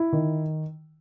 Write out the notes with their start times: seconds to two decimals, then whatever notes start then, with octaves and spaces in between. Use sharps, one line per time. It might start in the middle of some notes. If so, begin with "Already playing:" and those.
Already playing: E4
0.13 D#3